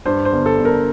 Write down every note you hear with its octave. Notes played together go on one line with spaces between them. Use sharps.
G2 C5
C5
G1
A4
G1
A#4